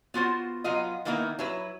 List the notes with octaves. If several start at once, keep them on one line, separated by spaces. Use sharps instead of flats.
B3 F4 F#4 C5
F#3 B3 F4 D#5
D#3 E3 A#3 B3 D#4 E4
F#3 E4 B4